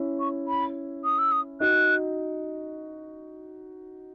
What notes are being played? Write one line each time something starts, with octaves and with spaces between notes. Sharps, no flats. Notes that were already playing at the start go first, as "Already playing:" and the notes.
Already playing: C#4 E4
C#6
B5
D#6
E6
D#6
D#4 F#4 F#6